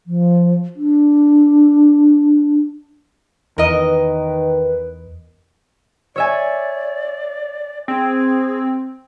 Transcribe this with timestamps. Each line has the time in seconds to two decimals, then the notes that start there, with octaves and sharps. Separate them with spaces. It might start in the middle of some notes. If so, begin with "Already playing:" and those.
0.07 F3
0.76 D4
3.58 E2 D#3 A#4 B4 D#5
6.16 C#5 D5 E5 G#5
7.88 C4 G#4